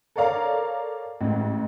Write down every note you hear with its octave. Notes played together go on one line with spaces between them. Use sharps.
A4 A#4 C#5 D5 F5 A#5
A1 G#2